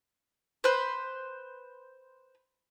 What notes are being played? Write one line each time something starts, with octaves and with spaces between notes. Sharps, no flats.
B4 C5